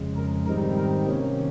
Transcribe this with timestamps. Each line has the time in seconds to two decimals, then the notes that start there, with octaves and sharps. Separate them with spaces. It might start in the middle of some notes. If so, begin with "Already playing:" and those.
Already playing: F2 C#3 G#3
0.17 A#4
0.46 G#2 D#3 G3 C4 D#4 A#4
0.77 A#4
1.06 C3 D#3 A#3 C#4